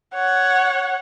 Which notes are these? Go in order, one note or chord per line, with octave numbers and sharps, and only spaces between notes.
C#5 F#5